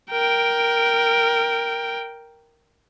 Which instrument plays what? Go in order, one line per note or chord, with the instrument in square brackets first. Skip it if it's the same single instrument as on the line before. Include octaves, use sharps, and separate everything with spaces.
[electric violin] A#4 G5